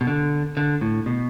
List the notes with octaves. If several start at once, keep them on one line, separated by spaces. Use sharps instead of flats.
B2
D3
D3
A2
B2